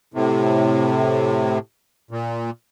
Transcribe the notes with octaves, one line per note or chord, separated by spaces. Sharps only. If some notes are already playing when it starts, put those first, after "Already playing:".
A2 C3
A#2